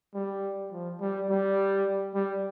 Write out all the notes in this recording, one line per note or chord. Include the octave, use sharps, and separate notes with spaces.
G3
F3
G3
G3
G3